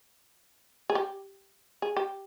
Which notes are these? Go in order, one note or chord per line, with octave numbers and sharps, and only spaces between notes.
G#4
G4
G#4
G4